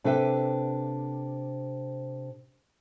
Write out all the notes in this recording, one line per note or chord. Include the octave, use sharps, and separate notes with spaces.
C3 D4 A4 B4 E5 G5